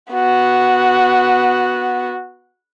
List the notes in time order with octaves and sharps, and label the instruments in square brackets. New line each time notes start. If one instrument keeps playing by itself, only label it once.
[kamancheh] B3 F#4